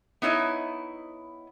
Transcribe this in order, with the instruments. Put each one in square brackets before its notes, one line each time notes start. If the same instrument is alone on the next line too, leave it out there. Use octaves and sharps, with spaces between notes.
[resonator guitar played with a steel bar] B3 D#4 E4 C#5 D#5